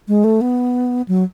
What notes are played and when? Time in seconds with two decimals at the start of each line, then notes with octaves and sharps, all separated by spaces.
0.08 G#3
0.24 A3
0.41 B3
1.08 F#3